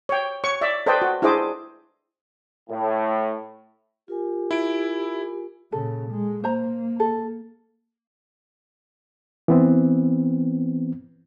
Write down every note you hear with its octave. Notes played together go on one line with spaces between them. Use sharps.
C#5 G5
C#5 C#6
D5 E5
A4 B4 C5 D5 D#5 G5
F#4
D4 E4 G#4 C5 D#5 D6
A2
F4 G4 A#4 G#5
E4 D7
A#2 C#3 A4
G#3
A#3 C5 A#5
A4
E3 B3 C4